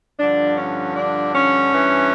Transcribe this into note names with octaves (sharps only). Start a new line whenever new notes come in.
G2 D3 F3 D4
C#4
D4
C#4
G2 E3